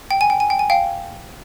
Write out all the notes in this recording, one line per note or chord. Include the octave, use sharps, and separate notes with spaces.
G5
G#5
G5
G#5
G5
G#5
F5 G5